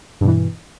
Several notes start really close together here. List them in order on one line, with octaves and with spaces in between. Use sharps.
G2 B2 E3